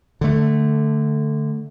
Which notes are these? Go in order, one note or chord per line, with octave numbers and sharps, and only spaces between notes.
D3 A3